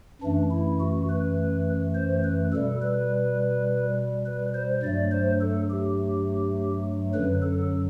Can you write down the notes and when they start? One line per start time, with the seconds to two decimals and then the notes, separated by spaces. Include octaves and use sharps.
0.22 F#2 E3 A3 D4
0.51 E4
0.80 F#4
1.09 B4
1.95 C5
2.24 B4
2.53 B2 G3 A4
2.82 B4
4.26 B4
4.55 C5
4.83 G2 F#3 A3 D5
5.12 C5
5.41 A4
5.70 G4
7.14 F#2 D3 F#3 B4
7.42 A4